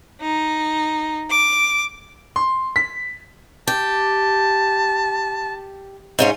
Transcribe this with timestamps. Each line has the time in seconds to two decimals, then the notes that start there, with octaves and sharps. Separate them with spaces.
0.22 D#4
1.30 D6
2.36 C6
2.76 B6
3.68 G4 A5
6.19 G#2 C#4 F4